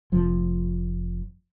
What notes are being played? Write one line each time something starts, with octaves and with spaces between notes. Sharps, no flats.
F1 F3